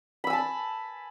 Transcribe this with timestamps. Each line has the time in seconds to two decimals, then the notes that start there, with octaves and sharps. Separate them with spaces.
0.24 B5
0.27 E6
0.30 G#5
0.33 A5